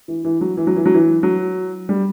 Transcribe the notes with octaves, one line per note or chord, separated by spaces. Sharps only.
E3
E3
F#3
E3
F#3
E3
F#3
E3
F#3
G3